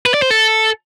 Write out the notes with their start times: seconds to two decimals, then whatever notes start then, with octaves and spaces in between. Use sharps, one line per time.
0.06 B4
0.14 D5
0.22 C5
0.31 A4